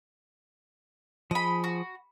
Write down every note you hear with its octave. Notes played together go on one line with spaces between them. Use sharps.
F3 G#4 D#5 B5
F#4